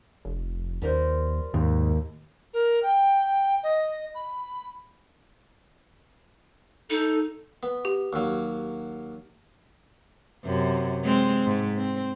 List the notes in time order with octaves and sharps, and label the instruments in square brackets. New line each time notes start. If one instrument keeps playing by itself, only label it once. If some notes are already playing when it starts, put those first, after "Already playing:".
[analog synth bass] F1
[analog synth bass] D#2 [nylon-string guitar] G3 A#4 C5
[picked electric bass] D#2 [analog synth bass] G#2
[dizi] A#4
G5
D#5
B5
[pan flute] D#4 [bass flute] A4
[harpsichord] B3
[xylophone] G4
[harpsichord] D#2 F#3
[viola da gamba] F#2 C3
G#3 C4
G#2
C4